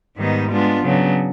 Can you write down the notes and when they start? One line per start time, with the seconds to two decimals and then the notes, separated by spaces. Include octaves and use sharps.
0.17 G#2 D#3 G3 B3 D#4
0.51 G#3 B3 D4 F4
0.83 C#3 F#3 B3 D4